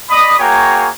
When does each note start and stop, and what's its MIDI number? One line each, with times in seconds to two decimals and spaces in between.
0.10 0.37 74
0.10 0.37 75
0.10 0.37 83
0.10 0.37 87
0.39 0.87 58
0.39 0.87 66
0.39 0.87 68
0.39 0.87 73
0.39 0.87 79
0.39 0.87 82